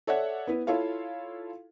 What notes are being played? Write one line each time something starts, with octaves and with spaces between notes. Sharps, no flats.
A4 C#5 D5 E5 F#5
B3 E4 B4
E4 F4 A4 C#5 F5